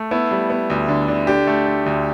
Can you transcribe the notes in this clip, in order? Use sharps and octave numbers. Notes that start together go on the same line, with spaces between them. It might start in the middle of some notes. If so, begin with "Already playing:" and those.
Already playing: A3
B3 E4
G3
B3
D2
D3
D3
D3 G4
A3
A3
D2